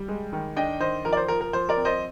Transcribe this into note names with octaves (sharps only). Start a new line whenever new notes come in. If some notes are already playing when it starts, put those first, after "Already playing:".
Already playing: G3
G#3
D#3
D4 D#5 G5
D#3 C5 D#5
F3 A#4
D5
C5
F3 A#4
A#4
F3 C5
A#4 D5
C4
C5 D#5